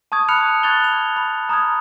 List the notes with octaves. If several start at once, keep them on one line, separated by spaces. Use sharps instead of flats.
A5 C#6 D#6 G#6
A5 B5 F6 F#6 C#7 F7
C#6 F#6 G#6 A6 F7 G7
F7
B5
A#5 D#6 F6 G#6